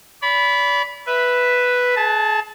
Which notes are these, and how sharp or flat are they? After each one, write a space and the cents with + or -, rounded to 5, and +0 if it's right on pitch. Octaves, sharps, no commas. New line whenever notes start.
D5 -40 B5 +0
B4 +0 E5 +0
G#4 +35 A5 +0